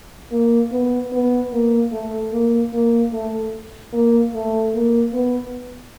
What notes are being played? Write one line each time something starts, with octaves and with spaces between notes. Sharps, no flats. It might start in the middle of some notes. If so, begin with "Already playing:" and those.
A#3
B3
B3
A#3
A3
A#3
A#3
A3
A#3
A3
A#3
B3